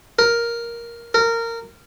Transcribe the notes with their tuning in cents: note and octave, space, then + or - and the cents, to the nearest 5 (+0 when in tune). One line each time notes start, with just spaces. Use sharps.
A#4 +5
A#4 -20